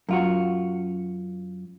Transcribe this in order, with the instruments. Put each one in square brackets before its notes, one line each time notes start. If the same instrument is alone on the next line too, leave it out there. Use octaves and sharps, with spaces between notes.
[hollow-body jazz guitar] F#2 F4 F#4